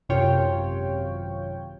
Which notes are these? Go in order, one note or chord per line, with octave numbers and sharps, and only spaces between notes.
G#1 F#2 C3 F4 C#5 G5